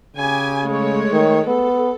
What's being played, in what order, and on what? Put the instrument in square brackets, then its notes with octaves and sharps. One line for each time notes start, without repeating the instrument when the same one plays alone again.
[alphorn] C#3 [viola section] G4 G#5
[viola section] G#3 A3 C#5
[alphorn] D#3
[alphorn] B3 [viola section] A4